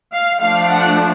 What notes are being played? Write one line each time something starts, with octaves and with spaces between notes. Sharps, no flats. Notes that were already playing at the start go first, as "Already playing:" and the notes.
F5
F3 A3 D4 F5
F#5